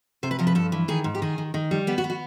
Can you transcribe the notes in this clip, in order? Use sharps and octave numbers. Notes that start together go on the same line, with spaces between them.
C3 C5
B4
F3 A#4
B4
G2 A4
E3
D#3 G#4
G#2
G4
D#3 G#4
D#3
D#3
G3
B3 G4
F#4
B3
F#4